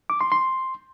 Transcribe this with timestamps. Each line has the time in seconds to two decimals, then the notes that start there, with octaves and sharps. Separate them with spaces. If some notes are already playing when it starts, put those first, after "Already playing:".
0.10 D6
0.21 C6
0.32 C6